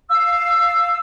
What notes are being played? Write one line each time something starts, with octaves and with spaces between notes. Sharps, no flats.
F5 E6